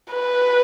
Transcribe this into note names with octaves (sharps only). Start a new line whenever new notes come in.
B4